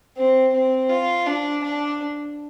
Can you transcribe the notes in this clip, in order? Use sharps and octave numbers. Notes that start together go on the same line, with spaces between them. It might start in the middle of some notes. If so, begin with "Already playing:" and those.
C4
C4
F4
D4
D4